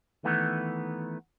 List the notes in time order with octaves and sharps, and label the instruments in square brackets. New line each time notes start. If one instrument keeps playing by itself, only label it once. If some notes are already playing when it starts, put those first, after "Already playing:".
[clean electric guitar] D#3 E3 A3 B3